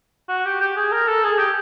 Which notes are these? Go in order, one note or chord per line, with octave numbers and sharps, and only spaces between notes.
F#4
G4
G4
G#4
A#4
A4
G#4
G4